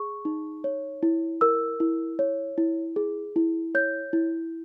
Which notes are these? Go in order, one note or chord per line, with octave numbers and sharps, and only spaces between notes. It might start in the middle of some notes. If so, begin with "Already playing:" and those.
Already playing: G#4 C#6
D#4
C#5
E4
A#4 E6
E4
C#5
E4
G#4
E4
C#5 G6
E4